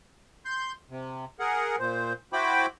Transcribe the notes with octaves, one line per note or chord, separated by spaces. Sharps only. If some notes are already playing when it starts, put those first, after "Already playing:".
C6 G6
C3
G#4 A#4 F#5
A#2 C5
E4 F#4 C5 G5 B5 D6